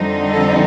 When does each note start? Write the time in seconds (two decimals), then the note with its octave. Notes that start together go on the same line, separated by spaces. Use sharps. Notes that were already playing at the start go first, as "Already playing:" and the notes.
Already playing: F2 D3 G3 C4 D#4
0.31 A4